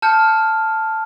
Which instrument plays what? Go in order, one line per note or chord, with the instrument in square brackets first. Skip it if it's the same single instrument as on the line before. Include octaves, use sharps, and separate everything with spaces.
[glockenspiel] A5 F6 G6 C#7